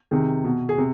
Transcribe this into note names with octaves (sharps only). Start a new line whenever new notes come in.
C3 D#3 G#4
B2
G#4
C3